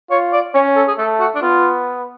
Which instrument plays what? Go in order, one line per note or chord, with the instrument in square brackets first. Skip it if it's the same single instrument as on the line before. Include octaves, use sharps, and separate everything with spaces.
[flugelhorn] F4 [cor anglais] C#5
[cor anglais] D5
[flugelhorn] C#4 [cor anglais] C#5
[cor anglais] A4
G#4
[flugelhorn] A3 [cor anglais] A4
[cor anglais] F#4
D4
[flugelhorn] B3 [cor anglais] F4